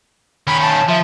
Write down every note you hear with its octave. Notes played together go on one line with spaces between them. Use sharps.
D#3 C#4 B5
A5
F3 E5